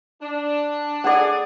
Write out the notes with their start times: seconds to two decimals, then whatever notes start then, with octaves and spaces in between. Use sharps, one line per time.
0.21 D4
1.04 A3 G#4 D5 F#5